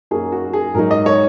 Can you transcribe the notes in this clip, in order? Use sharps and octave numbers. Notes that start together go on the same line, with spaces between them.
F#2 F#3 A#3 D#4 G#4
F#4
G#4
G#2 F#3 D#4 A#4
D#5
C#5